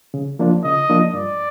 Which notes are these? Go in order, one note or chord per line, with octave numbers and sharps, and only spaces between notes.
C#3
F3 A#3 D4 F4
C#3 D#5
F3 A#3 D4 F4
G2 D5